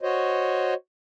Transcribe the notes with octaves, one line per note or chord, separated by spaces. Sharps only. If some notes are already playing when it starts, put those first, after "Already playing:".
F#4 C5 C#5 D#5